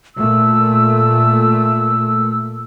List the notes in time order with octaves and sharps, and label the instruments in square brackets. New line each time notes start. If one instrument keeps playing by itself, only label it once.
[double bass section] A#2 A3 [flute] E6